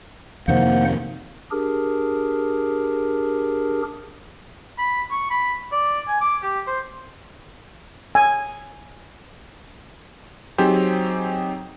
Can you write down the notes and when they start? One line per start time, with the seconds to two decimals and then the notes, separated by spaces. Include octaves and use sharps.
0.48 F2 C3 D#3 A#3 C5 F#5
1.51 D4 G4 G#4 A#4
4.78 B5
5.11 C#6
5.30 B5
5.72 D5
6.08 G#5
6.21 D6
6.43 G4
6.67 C5
8.15 G#5
10.58 F#3 C4 D#4 G4 G#4 C5